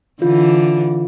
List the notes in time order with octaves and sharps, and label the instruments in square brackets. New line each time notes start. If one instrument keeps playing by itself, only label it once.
[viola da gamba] D3 E3 [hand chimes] F4